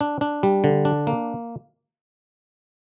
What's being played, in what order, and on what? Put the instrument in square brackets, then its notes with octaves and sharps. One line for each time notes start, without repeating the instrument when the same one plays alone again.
[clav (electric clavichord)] D4
D4
G3
D3
D4
A#3